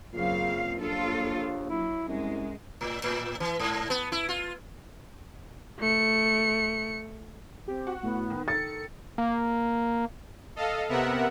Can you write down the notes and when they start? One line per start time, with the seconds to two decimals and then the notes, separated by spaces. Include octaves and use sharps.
0.13 F#2 A#2 C#3 C4 F5
0.81 A#1 D#2 F4 A4
1.70 F#3 E4
2.08 C2 F#2 G#3
2.81 A2
3.04 A2
3.40 E3
3.59 G#2
3.90 B3
4.12 E4
4.29 F4
5.79 A3 C#7
7.68 C4 G4
7.87 F#4
8.03 A2 B3
8.30 D#3
8.48 A4 A6 C#7
9.18 A#3
10.56 A4 D#5 F5
10.89 C3 B3 A#4 E5 F#5